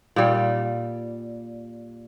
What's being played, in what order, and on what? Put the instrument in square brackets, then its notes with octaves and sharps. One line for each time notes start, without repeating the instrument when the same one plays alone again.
[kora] A#2 G3